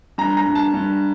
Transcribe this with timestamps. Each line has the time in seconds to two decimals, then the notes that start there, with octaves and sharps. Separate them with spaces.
0.18 G2 A#5
0.37 A#5
0.46 G2
0.55 A5
0.74 G2